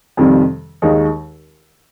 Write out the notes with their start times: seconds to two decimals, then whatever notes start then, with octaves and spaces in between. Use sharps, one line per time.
0.17 F2 C3 D#3 G3
0.82 D#2 D#3 G#3 D#4